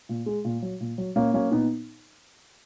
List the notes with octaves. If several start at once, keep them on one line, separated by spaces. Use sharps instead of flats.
A#2
G#3
A#2
F#3
A#2
F#3
A#2 A#3 C#4
F#3 A#3 C#4
A#2 B3 D#4